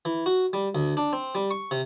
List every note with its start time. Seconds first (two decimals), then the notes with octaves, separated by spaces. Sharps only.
0.05 E3
0.26 F#4
0.53 G3
0.75 D2
0.97 D4
1.13 C4
1.35 G3
1.51 C#6
1.71 C3